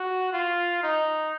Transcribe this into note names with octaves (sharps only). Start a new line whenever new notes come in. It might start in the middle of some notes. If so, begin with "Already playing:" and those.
Already playing: F#4
F4
D#4